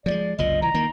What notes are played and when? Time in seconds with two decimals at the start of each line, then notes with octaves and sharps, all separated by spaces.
0.06 F3 F#3 G#3 D5
0.38 F#1 C2 F3 D#5
0.62 E3 A#5
0.74 D#3 A#3